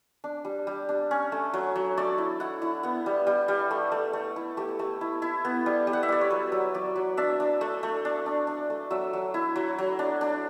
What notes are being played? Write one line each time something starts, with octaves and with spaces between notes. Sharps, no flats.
D4
G3
G3
D4
C#4
A3
F#3
F#3
A3 D5
E4
E4 F#5
E4
B3 F#5
G3
G3
G3
A3
A3
A3
E4
A3 G4
A3
E4
E4
B3
G3
G3
F#5
E5
G3 D5
C#5
F#3 B4
F#3
F#3 D5
F#3
D4 E5
D4
A3
A3
D4
D4
D4
A3
F#3 E5
F#3
E4
F#3
F#3
D4
D4